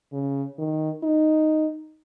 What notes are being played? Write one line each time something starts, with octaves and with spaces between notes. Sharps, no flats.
C#3
D#3
D#4